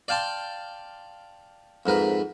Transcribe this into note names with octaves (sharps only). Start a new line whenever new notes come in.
D5 F5 G5 A5 C6
F2 G#2 A#4 B4